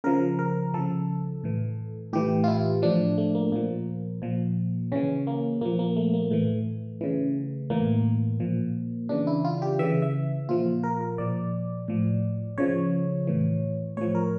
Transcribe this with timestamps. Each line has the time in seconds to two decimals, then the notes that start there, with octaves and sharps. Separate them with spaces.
0.04 C#3 F3 A#4
0.39 A#4
0.74 C#3 F3 A4
1.44 A2 E3
2.13 A2 E3 G4
2.44 F4
2.48 E4
2.82 A2 F3 D4
3.18 A3
3.35 A#3
3.52 A#2 F3 A#3
4.22 A#2 F3
4.92 C#3 E3 C#4
5.27 A#3
5.61 A#2 F3 A#3
5.79 A#3
5.97 A3
6.14 A#3
6.31 A2 E3 A3
7.01 C#3 E3
7.70 A2 E3 A#3
8.40 A#2 F3
9.09 C#3 E3 D4
9.27 E4
9.45 F4
9.62 G4
9.79 C#3 E3 E5
10.02 E5
10.49 A#2 F3 F4
10.84 A#4
11.01 A#4
11.18 A#2 F3 D5
11.88 A2 F3
12.58 C#3 F3 C#5
13.27 A2 E3
13.97 A2 F3 C#5
14.15 A#4